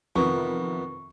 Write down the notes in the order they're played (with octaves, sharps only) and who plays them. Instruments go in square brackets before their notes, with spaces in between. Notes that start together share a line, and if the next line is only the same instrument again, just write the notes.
[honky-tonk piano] F2 C3 D#3 [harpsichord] E3 B3 [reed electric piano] F4 A#4 [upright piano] C#6